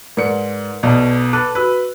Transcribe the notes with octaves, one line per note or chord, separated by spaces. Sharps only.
G#2 A#4 B4 D5 C#7
B1 B2 D5 D#5
A4 B4 D6 F#6 D#7
F#4 B4 E6 F#6